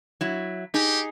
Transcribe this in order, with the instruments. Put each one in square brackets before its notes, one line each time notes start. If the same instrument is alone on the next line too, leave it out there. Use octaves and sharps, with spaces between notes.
[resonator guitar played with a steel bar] F#3 E4
[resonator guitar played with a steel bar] D#4 G#4 [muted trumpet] G4